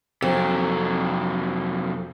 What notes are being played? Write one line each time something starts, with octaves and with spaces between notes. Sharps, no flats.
F2 C3 F#3